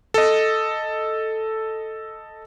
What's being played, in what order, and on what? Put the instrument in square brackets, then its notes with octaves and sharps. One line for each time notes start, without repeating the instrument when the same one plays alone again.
[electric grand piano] A4 D#5